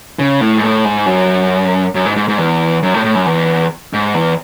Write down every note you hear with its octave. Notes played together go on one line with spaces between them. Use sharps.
C#3
A2
G#2
A2
G#2
F#2
F#2
G#2
G#2
G#2
E2
F#2
A2
A2
F#2
E2
G#2
E2